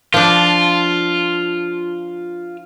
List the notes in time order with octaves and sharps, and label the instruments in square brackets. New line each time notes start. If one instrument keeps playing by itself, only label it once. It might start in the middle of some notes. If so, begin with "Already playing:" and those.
[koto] F3 D4 [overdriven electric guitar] F4